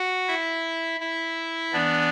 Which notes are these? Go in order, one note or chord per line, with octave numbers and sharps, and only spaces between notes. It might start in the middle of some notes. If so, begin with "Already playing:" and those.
Already playing: F#4 F#5
E4 E5
E4 E5
E3 B3 D4 D5